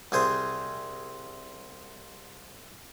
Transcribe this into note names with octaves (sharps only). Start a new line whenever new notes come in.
C2 G#4 C5